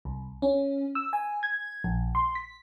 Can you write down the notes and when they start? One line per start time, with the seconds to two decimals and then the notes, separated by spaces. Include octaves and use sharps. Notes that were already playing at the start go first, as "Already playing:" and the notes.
0.05 C2
0.42 C#4
0.95 E6
1.13 G#5
1.43 G#6
1.84 A#1
2.15 C6
2.35 B6